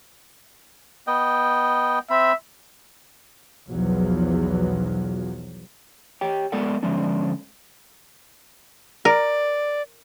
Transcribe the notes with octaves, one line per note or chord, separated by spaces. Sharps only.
B3 D#5 G5
C4 E5 B5
B1 E2 F3 F#3
G4 C#5 G5
G#3 B3 A4 A#4 D5 F#5
D3 F3 G#3 C#4 D4
A#4 D5